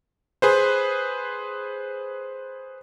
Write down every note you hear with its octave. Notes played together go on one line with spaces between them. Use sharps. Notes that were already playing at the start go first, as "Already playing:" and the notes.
G#4 B4 C5